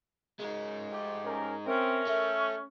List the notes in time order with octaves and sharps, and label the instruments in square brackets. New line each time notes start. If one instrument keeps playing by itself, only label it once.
[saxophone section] F#2 C#3 [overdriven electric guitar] G#3 D#4
[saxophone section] F3 A3 G4
[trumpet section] C#4 A#4
[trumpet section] C4 E5 [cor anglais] C#4 [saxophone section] A#4
[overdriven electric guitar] A3 [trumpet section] E5